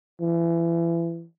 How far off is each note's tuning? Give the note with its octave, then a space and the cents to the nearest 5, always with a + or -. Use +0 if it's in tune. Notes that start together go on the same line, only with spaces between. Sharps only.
E3 +30